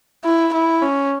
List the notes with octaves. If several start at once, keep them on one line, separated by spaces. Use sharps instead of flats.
E4
E4
C#4